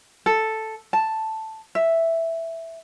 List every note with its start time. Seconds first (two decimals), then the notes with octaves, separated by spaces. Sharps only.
0.26 A4
0.93 A5
1.75 E5